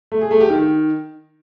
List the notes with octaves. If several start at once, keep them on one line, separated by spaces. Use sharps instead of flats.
A3
G#4
A3
G4
D#3